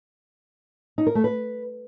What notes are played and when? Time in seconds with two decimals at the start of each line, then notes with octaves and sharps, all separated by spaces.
0.98 D#4
1.07 A#4
1.15 A3
1.24 B4